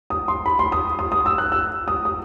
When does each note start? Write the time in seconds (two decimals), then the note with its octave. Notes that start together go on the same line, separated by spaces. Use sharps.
0.10 D#6
0.28 C6
0.46 B5
0.59 C6
0.72 D#6
0.99 D#6
1.12 D#6
1.26 E6
1.38 F#6
1.52 E6
1.88 D#6
2.05 D#6